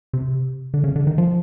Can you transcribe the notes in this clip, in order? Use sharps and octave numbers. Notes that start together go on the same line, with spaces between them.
C3
D3
C#3
D3
D#3
F3